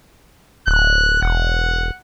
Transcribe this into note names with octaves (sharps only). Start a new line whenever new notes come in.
D1 F#6
E1 F#5